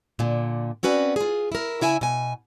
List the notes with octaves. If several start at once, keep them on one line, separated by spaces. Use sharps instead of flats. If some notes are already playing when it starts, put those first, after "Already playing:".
A#2 D3
C4 C#4 F#4 B4 D5
F4 G#4
E4 A#4
C#3 E4 E5 G#5
B2 G#5